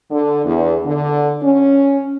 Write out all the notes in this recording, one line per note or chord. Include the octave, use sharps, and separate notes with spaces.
D3
E2
D3
C#4